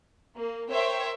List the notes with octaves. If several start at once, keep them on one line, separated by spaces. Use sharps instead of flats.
A#3
A#4 C5 C#5 E5 G5